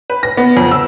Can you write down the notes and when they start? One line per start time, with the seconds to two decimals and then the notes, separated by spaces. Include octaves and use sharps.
0.10 B4
0.23 A#6
0.37 B3
0.57 F2
0.71 E6